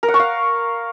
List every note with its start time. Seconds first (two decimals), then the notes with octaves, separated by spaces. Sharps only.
0.03 A#4
0.08 F#5
0.14 C#6
0.19 F5